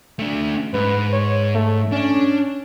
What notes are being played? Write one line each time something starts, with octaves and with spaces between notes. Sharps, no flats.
A3 D4
G#2 B4
C#5
A3
C#4 D4